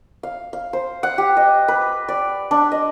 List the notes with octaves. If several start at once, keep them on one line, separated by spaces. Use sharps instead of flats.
F5
F5
C5
F#5
G4
D#5
B4
D5
D4
D#5